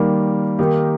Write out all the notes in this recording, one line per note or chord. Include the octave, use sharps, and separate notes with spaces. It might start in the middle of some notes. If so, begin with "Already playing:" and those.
Already playing: D#3 G3 A#3
D#3 A#3 D#4 G4